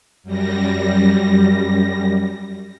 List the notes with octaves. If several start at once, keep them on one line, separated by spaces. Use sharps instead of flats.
F#2 G3 A#6